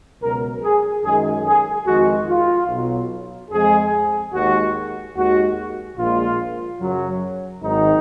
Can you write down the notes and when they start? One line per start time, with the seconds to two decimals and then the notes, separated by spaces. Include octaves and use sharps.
0.21 C#2 B2 F#3 A#4
0.62 G#4
1.04 F#2 D#3 G#3 G#4
1.45 G#4
1.86 F2 D#3 G#3 F#4
2.27 F4
2.68 B1 B2 F#3
3.51 F2 F3 G#3 G#4
4.33 D#2 D#3 G#3 F#4
5.15 D#2 D#3 G#3 F#4
5.97 A#1 A#2 G#3 F4
6.80 F#2 C#3 F#3
7.62 G#1 G#2 D#3 F#3 D#4